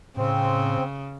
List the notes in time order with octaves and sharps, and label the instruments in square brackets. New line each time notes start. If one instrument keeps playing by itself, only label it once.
[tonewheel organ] A2 [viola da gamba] C#3 [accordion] C4